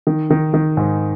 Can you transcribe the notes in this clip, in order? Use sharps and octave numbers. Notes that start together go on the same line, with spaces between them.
D#3
D#3
D#3
G#2